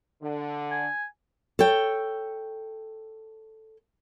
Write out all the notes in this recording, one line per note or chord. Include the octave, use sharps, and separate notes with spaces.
D3
G#5
A4 C#5 G5